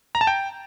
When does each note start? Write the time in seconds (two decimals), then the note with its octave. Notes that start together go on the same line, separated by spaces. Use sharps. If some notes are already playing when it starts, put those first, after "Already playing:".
0.15 A#5
0.21 A5
0.27 G5